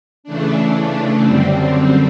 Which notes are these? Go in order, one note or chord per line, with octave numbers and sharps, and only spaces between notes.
C#3 E3 A3 D4
F#2 D3 G3 C4